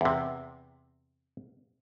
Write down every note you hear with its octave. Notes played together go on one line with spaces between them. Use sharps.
E2 C3